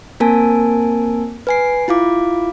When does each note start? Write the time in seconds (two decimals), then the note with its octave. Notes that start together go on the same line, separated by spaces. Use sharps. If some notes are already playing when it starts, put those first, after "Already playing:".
0.20 A#3 C4 A#4 G#5 A5
1.47 B4 G#5 C7
1.88 E4 F4 F5 D6